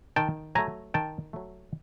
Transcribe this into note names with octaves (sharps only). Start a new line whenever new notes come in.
D#3 G5 A5
F#3 A3 G#5 A#5
D#3 G5 A5
F#3 A3